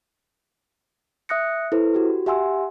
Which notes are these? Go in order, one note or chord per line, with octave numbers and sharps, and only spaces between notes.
E5 D#6 F#6 A#6 C#7
E4 A4 B4 C5
F#4 G4
G4 E5 F#5 G#5 C6 E6